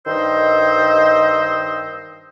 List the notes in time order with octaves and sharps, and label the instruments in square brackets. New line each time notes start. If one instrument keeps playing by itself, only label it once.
[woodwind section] G2 D#3 C5 D#5 E6